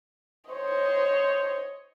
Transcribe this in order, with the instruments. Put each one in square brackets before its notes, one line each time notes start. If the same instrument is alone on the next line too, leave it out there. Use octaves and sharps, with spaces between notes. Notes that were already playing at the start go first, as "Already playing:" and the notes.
[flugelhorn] C5 [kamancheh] C#5 D#5